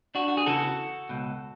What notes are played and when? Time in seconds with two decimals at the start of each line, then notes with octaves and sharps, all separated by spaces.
0.15 D4 F#4
0.28 F#4
0.37 G#4
0.46 E2 C#3 E3 F#4 A4
1.09 C#2 B2